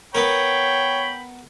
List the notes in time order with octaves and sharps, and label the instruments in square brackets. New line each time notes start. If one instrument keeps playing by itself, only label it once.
[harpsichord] B3 A#4 [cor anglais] C#5 [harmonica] G5 B5